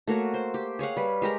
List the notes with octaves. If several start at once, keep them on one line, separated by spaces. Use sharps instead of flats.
A3 A#3 F#4 C#5
C5
G4
G#4 C#5 F5 F#5
G3 B4
G#3 G4 A#4 A#5